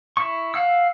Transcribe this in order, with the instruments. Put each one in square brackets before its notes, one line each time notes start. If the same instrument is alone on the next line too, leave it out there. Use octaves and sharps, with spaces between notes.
[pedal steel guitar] E4 C#6
F5 F#5 E6